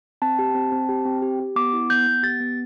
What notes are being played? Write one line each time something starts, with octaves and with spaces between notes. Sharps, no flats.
C4 A5
G4
C4
C4
G4
C4
G4
G4
B3 D6
E4
B3 G6
B3
G4 A6
B3